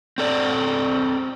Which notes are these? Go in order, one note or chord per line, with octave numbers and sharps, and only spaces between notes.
C4 A4 D5